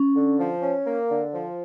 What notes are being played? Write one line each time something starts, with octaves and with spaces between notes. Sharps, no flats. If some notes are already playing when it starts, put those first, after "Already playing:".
Already playing: C#4
D3
F3
C#4
A#3
D3
F3